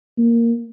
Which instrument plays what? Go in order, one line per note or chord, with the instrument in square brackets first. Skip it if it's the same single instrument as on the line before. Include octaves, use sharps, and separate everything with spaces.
[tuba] A#3